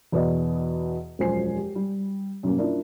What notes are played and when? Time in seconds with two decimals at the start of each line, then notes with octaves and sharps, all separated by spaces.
0.12 E2 B2 B3 D5 D#5
1.19 E1 F#2 F3 C5 G#5 C7
1.56 G4
1.75 G3
2.43 F#2 B2 G3 A#3 C#4
2.58 C#4 D4 E4 F4 A#4 D5